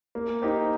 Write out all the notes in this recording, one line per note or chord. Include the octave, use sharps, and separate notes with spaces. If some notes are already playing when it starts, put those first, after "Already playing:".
A#3
D#4 G4 C5